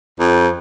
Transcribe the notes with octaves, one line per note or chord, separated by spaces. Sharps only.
F2